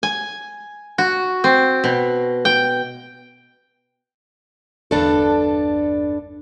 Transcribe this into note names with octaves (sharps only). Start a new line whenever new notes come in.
G#5
F#4
C4
B2
G5
G1 E2 G2 D4 A4